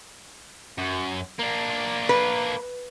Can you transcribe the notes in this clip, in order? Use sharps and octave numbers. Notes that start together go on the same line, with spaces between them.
F#2
A#3 D4
B4